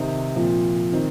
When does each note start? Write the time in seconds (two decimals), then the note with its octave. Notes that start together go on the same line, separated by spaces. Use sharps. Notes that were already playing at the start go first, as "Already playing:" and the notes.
Already playing: C3 D#3 C4 D#4
0.35 A#2 F3 C4
0.92 D#3 C4 D#4